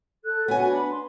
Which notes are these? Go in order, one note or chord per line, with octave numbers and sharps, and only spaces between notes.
A4 F#6
B3 F#4 C#5 G#5
D4 B5
C6